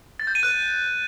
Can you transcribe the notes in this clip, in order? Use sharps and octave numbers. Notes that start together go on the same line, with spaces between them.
A6
G6
D#7
F#6